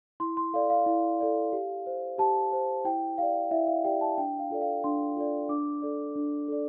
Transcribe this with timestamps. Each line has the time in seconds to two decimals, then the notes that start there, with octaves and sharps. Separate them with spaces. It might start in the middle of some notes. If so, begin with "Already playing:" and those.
0.20 E4 C6
0.37 C6
0.53 A4 D5 F5
0.70 F5
0.86 E4
1.20 A4 D5
1.53 G4
1.86 C5
2.18 G4 A5
2.52 C5
2.85 E4 G5
3.18 G4 D5 F5
3.51 E4 E5
3.67 F5
3.84 G4 D5 G5
4.01 A5
4.18 D4 G5
4.39 F5
4.50 F4 A4 D5
4.61 F5
4.84 D4 C6
5.16 F4 A4 D5
5.49 D4 D6
5.82 A4 D5
6.16 D4
6.48 A4 D5